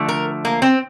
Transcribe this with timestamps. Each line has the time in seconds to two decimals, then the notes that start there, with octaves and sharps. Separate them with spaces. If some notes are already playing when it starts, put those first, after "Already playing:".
Already playing: D3 F3 A3
0.09 A#4
0.45 A#3
0.62 C4